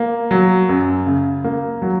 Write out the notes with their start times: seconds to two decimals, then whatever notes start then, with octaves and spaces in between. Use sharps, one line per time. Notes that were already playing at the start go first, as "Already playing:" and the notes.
Already playing: A#3
0.31 F#3
0.69 F#2
1.06 C#3
1.44 A#3
1.82 F#3